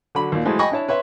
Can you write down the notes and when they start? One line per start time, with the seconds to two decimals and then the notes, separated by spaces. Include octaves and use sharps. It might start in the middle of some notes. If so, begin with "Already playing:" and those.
0.15 D3 F#3 B5
0.32 D#2 A#2
0.45 E3 F#3 G#3 A3 C5
0.59 D#5 G5 G#5 B5 C#6
0.71 D4 E4 C#5 A5
0.88 B4 C#5 E5 C6